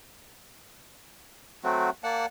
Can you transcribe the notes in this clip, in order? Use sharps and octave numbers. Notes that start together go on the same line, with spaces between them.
F#3 A3 C4 F#4
A#3 D5 F#5 A5